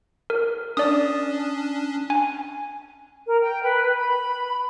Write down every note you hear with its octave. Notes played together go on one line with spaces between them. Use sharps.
A#4
C#4 D4 D5 D#6
G#5
A#4
G5
B4
B5